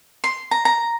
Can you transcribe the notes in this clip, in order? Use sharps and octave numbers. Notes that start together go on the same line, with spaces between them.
C6
A#5
A#5